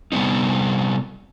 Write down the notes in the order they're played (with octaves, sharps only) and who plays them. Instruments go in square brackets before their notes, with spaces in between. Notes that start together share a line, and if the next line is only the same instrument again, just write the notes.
[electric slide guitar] C3 G3 B3 C4 D#4